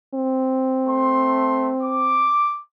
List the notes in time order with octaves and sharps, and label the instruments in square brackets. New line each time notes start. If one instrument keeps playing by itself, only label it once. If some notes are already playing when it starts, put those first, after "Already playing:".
[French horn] C4
[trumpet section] A3 C6
D6